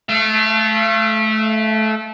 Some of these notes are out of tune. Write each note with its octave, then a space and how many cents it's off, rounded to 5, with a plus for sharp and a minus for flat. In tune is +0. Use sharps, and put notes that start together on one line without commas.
A3 -20 F5 -45